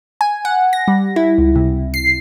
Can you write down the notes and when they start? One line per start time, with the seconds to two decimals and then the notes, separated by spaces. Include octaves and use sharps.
0.21 G#5
0.45 F#5
0.73 A#6
0.88 G3
1.16 E4
1.38 C#2
1.56 C3
1.94 C7